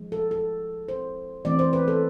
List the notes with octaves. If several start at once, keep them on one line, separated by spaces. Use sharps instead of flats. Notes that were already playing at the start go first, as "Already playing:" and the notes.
Already playing: F3 G#3
A4
A4
C5
E3 A3 C4 D5
C5
B4
A4